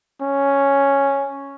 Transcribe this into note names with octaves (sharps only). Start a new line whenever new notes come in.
C#4